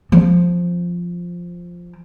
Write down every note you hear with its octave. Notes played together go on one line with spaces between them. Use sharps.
F3 C4